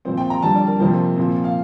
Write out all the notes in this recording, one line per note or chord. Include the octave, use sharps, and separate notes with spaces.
A#2 F3 C4 C5
G5
A#5
F2 D3 G3 A5
D5
A#4
F2 C3 F3 A#3 C5
A#2 F3 C4
F5